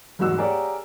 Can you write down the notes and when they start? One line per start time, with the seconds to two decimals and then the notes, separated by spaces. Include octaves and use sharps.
0.19 F#1 E2 G#2 F#3 F#4 E6
0.38 G4 G#4 A#4 C#5 D5 F#5